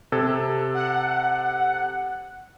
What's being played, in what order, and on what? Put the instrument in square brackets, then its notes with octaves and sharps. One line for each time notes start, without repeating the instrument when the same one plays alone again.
[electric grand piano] C3 A4 G#6
[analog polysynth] F#5